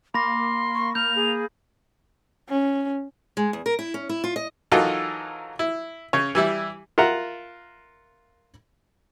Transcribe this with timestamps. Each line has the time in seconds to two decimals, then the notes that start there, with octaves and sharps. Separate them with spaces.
0.14 A#3 B5 C6 D6 A#6
0.74 C#6
0.95 A#3 F6 G6 F7
1.16 G#4
2.49 C#4
3.37 G#3
3.53 E2
3.66 A#4
3.79 E4
3.94 C#4
4.09 E4
4.24 F4
4.36 D#5
4.72 E3 F#3 D#4 F4 A4 A#4
5.59 E4
6.13 C#3 C#4 C#5
6.35 E3 G3 E4
6.98 F4 A#4 E5 F#5 A#5